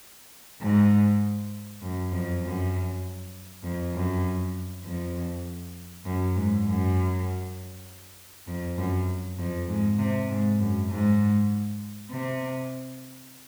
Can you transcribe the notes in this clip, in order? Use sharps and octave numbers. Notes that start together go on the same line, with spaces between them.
G#2
F#2
F2
F#2
F2
F#2
F2
F#2
G#2
F#2
F2
F#2
F2
G#2
C3
G#2
F#2
G#2
C3